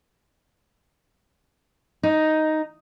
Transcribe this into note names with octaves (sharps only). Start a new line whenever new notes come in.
D#4